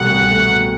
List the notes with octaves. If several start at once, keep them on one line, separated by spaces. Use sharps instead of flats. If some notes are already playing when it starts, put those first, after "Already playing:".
Already playing: C2 B2 A3 F#5
C2
A3
B2